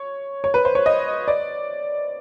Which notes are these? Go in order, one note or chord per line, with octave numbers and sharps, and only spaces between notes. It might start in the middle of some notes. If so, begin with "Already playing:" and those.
Already playing: C#5
C#5
B4
C5
C#5
D#5
D5